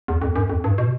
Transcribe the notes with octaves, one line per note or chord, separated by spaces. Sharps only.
E2
F2
F#2
F2
G2
B2